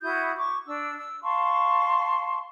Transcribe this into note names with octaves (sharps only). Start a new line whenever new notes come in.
E4 F#4 D#6 G6
C#6 D6
D4 E6
E6
F5 A5 C6 C#6